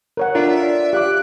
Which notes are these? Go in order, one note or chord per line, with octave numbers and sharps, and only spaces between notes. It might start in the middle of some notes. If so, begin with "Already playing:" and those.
A#4 C#5 F#5
D4 F4 A4 A#4 E5
D5
G4 F5 D6 F#6